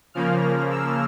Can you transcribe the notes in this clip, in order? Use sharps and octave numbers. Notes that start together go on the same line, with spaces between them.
C#3 F3 A#3 F6
E6